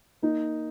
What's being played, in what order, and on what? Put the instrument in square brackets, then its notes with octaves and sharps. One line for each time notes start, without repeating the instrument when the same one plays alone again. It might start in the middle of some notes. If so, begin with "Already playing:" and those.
[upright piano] A#3 D#4